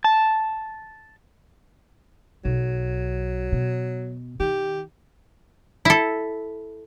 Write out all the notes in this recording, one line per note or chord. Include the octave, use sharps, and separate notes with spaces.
A5
B1 F#3
B2
D#3 G4
E4 A4